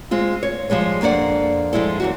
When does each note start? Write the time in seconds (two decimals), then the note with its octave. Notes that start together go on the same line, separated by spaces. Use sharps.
0.11 G#3 C4 F4
0.43 C#5
0.70 F3 G3 G#3 C#5
1.01 F2 A#3 D4 D5 F#5
1.73 F3 G3 G#3 E4 A4
2.00 F#2 E3 F#4